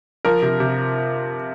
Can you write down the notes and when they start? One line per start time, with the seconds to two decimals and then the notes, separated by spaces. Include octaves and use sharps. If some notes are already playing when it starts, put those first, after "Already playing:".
0.25 F3 A#4
0.42 C3
0.60 C3